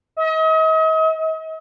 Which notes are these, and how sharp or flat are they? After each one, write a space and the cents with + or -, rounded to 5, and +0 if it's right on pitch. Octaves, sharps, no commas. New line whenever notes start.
D#5 +40